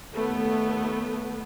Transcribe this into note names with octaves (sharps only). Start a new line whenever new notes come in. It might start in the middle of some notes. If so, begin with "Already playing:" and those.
D#2 A3 B3